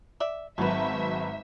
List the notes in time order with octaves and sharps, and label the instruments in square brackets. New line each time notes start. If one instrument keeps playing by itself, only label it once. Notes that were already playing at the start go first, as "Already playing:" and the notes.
[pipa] D5 E5
[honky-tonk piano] G#1 F#3 B4 [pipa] A3 B3 [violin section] E5